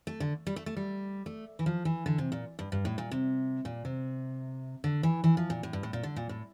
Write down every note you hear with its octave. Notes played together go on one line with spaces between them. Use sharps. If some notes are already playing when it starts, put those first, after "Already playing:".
A3
D3
G3
A3
A3
G3
A3
E3
F3
E3
D3
C3
A#2
G2
G2
A2
A#2
C3
A#2
C3
D3
E3
E3
F3
A#2
A2
G2
A2
A#2
D3
A#2
A2